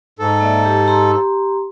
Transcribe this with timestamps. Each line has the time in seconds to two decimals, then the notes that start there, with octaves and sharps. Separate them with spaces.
0.19 G#2 A4
0.40 A#3 D5 E5
0.65 G4
0.88 G4 A#5 C6